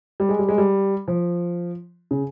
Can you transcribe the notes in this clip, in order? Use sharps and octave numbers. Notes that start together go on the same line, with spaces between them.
G3
G#3
G3
G#3
G3
F3
C#3